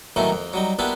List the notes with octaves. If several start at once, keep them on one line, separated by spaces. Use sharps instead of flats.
A2 D#3 E3 F#3 A3 A#3
F2
F#3 G3 D#4
A#3 B3 D4 E4 F4 G4